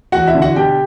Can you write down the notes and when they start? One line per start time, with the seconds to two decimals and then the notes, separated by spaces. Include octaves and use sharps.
0.12 E2 F#4 F#5
0.27 E4 E5
0.35 D3
0.42 F#4 F#5
0.56 B2 G4 G5